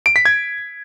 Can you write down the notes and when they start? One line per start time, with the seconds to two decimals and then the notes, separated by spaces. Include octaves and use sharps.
0.06 D7
0.16 B6
0.25 G#6